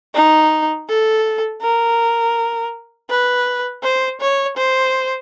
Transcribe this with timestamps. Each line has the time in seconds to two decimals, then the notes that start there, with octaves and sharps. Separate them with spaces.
0.14 D#4
0.89 A4
1.62 A#4
3.10 B4
3.83 C5
4.20 C#5
4.57 C5